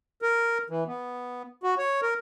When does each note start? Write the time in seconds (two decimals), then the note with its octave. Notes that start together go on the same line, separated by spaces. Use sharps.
0.22 A#4
0.70 E3
0.87 B3
1.63 F#4
1.78 C#5
2.02 A#4